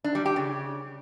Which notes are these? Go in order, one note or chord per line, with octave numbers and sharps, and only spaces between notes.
D4
G3
G4
C#3